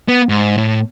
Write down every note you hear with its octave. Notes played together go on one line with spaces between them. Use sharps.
B3
G#2
A2